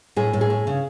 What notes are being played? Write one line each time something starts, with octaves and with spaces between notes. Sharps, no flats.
A2 G#4
A2
G#4
A2
C#3